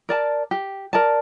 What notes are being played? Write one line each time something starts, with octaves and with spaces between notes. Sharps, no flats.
A#4 D5 A5
G4
A#4 D5 A5